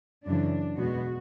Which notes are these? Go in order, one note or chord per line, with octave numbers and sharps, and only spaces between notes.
F#2 C#3 E3 D4
E2 B2 G#3 B3 F#4